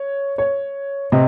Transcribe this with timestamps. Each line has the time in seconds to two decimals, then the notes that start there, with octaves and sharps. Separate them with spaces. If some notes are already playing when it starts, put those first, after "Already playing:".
Already playing: C#5
0.38 C#5
1.12 C3 D#5